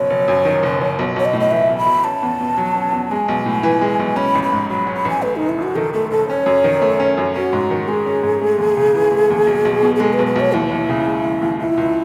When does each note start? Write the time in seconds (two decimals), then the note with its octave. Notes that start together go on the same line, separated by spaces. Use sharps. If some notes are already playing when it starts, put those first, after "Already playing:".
Already playing: F#1 B1 C#5
0.10 F#1
0.28 F#2
0.45 D#3
0.63 F#1
0.81 F#1
0.99 B1
1.16 B1 C#5
1.25 D#5
1.33 A2
1.41 D#5
1.51 E3 E5
1.69 B1
1.78 B5
1.86 B1
2.04 C#4 A5
2.23 E2
2.40 B2
2.57 F#3
2.75 C#4
2.92 E2
3.11 G#3 G#5
3.28 B1
3.46 A2
3.63 E3
3.81 G#3
4.00 B1
4.16 C#4 B5
4.35 A1
4.43 B5
4.52 G#2
4.70 F#3 B5
4.87 C#4
4.96 B5
5.05 A1 G#5
5.22 A3 B4
5.36 F#1 D#4
5.49 E4
5.58 F#2 F#4
5.76 D#3 A4
5.94 A3 A4
6.11 F#1 A4
6.28 C#4 C#5
6.46 F#2
6.64 D#3
6.82 A3
7.00 C#4
7.18 F#2
7.35 C#4 F#4
7.53 G#2
7.70 D#3
7.88 G#3 G#4
8.06 C#4
8.23 G#2
8.41 A3
8.58 D#2
8.77 C#3
8.94 E3
9.12 A3
9.30 D#2
9.47 B1
9.65 B1
9.83 B2
9.95 G#4
10.00 G#3 A4
10.13 B4
10.19 B1
10.27 B4
10.36 B1 C#5
10.53 D#2 E4
10.71 D#2
10.89 C#3
11.06 G#3
11.25 D#2
11.42 D#2
11.59 C#2 E4
11.77 C#2